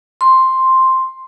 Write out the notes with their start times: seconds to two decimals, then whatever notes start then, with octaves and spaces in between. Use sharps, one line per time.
0.21 C6